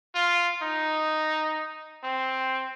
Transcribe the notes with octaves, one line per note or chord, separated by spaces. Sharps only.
F4
D#4
C4